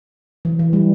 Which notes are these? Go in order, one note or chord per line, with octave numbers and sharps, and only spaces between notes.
E3
E3
G3